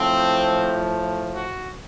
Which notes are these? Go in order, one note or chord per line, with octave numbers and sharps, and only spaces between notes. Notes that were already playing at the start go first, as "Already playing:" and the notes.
Already playing: A2 F3 C4
F4
F#4